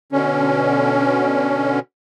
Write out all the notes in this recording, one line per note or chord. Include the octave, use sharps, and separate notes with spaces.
B2 D3 C#4